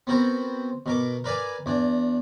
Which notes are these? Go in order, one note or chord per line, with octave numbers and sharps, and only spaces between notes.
B3 C4 F#4 A#4 C5
B2 A#4 D6
A#4 B4 D5 F5 G#5
E2 D4